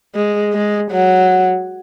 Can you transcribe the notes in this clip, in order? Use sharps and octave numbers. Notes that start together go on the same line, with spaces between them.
G#3
G#3
F#3